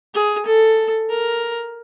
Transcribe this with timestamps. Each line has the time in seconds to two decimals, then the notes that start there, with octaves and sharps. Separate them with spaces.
0.15 G#4
0.46 A4
1.10 A#4